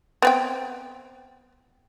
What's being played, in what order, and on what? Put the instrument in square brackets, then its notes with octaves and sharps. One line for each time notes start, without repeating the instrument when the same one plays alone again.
[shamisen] B3 C4 G5